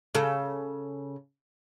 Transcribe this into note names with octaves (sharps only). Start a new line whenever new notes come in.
C#3 A4